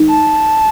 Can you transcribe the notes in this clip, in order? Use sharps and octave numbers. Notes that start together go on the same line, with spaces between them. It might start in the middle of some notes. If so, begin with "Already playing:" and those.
Already playing: D#4
A5